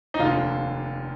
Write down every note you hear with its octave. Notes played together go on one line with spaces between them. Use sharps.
D#4
F1 D#2 D3 F4